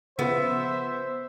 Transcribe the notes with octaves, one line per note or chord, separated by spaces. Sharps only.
C#3 F3 B3 C5 E5